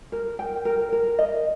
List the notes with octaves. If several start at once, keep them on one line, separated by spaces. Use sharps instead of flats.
A#4
G5
A#4
A#4
D#5